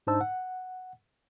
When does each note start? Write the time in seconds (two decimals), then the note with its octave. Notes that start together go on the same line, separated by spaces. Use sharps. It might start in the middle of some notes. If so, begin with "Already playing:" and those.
0.07 G#2 D4 D#4 C5 A5 E6
0.21 F#5